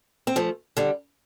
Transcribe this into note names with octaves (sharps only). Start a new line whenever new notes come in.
C4
F3 A3
D3 G3